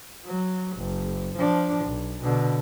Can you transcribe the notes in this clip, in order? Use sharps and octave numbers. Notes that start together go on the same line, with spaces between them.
F#3
F#1
F3 D4
B1
B2 D3